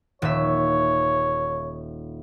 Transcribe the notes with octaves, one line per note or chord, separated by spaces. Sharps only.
D#1 C#5 E5